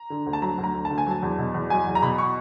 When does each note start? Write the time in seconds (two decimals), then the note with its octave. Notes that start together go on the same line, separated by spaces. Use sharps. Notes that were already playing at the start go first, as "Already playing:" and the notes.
Already playing: A#5
0.10 D3
0.26 D2
0.33 A5
0.42 F#3 A#5
0.58 D2
0.64 A#5
0.74 D3
0.85 A5
0.90 D2
0.98 G#5
1.06 F#3 A5
1.23 E2
1.38 B2
1.54 E2
1.70 F#3 G#5
1.87 E2
1.95 A#5
2.02 B2 B5
2.18 C#6